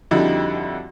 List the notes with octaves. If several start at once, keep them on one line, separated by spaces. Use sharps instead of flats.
F2 D3 G3 D#4 E4 F#4